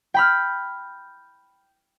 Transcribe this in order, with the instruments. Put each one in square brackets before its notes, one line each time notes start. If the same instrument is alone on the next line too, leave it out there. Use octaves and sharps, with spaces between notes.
[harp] G5 B5 F6